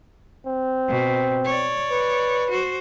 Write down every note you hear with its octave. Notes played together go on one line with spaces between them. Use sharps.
C4
B2
C#5 D5
B4
F#4 C5